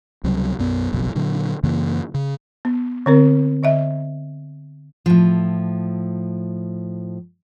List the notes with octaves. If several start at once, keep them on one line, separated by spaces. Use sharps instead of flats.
C#2 C3 F#3 G3
B1 F#2 B3
F#1 B1 F2 B2
A#2 D3 F#3
F#2 C#3 E3 A#3
C#3
B3
D3 C4 A#4
D3 D#5 E5
A2 F3